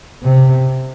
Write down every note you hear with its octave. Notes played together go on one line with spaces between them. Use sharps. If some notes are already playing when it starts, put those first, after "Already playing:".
C3